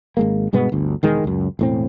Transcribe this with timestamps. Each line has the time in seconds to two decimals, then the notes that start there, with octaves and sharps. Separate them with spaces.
0.17 G#1 G#3 A#3
0.53 G2 B2 G#3 B3
0.72 G1 D2
1.03 E1 D#3 G#3
1.24 C#2 F#2
1.59 E1 A2 C4